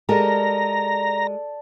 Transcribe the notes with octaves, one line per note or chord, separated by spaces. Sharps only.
G#3 G4 A4 A#4 D5 A#5